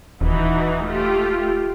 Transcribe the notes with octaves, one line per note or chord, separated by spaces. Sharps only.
D#1 E3 D#4 F#4
A3 F4 G4